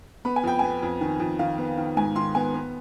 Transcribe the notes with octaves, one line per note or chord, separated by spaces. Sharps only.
B3 B5
G#5
F2 G5
B3 G#5
F2
D#3
F2
D#3 F5
B3
D#3
G#2 G#5
D#3 C6
B3 G#5
B3